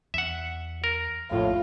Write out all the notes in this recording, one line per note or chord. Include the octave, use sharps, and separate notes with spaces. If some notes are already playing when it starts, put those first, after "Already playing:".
E2 E5 F#5
A#4
A#1 F2 A2 F4